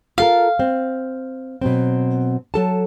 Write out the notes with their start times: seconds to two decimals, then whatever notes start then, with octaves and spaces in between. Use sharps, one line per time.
0.18 F4 A4 A#4 F5
0.59 C4
1.61 B2 F#3 C4
2.54 F#3 A4 A5